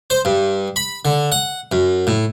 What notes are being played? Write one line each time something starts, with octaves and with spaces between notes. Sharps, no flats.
C5
G2
B5
D3
F#5
F#2
A2